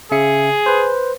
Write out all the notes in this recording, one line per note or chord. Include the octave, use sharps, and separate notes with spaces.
C#3 G#4 E5 C#7
B4 C5